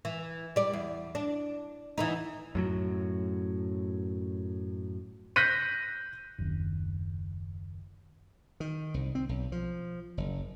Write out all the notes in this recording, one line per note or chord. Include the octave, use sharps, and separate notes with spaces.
E3
G3 D5
E2
D4
E3 B3 D#4
F#2 A2 F#3
F#6 G6 A#6 B6 D#7
F#1 D#2
D#3
C2
C4
B1
F3
F#1